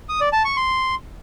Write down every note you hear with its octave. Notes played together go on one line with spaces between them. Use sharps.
D#6
D5
A5
C#6
C6